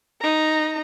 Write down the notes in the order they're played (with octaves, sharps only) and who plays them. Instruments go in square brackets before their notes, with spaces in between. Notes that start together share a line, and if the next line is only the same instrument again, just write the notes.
[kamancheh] D#4 A#5